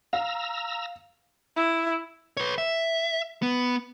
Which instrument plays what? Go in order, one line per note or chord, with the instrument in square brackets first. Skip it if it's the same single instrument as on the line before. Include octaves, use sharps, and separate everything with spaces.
[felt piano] F5 [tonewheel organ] A#5 E6
[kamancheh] E4
[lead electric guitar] B4 C#5
E5
B3